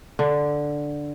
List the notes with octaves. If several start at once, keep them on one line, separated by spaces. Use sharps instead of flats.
D3